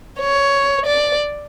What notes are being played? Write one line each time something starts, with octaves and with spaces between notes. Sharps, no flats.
C#5
D5